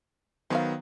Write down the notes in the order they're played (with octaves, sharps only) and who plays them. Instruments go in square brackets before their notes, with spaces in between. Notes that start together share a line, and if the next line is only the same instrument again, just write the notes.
[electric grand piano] D#3 F#3 B3 [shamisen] C5 C#5 F5